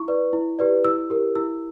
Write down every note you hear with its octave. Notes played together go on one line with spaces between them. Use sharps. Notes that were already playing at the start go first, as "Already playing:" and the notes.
Already playing: E4 C#6
B4 D5
E4
G4 B4 D5
E4 E6
G4 A#4
E4 E6